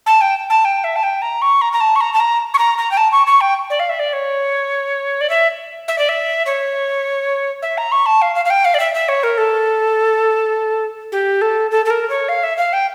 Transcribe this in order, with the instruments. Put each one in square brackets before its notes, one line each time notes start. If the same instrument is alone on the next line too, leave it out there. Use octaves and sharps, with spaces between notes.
[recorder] A5
G5
A5
G5
E5
A5
G5
A#5
C#6
A#5
A#5
A5
C#6
A#5
A5
A#5
C#6
A#5
A#5
G5
A5
C#6
C#6
G5
D5
F5
E5
D5
C#5
D5
E5
E5
D5
E5
C#5
E5
A#5
C#6
A5
F5
F5
F5
G5
F5
D5
E5
E5
C#5
A#4
A4
G4
A4
A4
A4
A#4
C#5
F5
E5
F5
G5